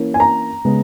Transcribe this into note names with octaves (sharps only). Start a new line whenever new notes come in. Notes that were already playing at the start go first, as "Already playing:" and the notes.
Already playing: E3 A#3 C#4
G#5
A#5
C#3 G#3 B3